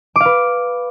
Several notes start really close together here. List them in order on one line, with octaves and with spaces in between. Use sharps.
D6 F5 B4